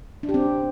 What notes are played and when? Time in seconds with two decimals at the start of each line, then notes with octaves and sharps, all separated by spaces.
0.23 D4
0.29 G4
0.34 C4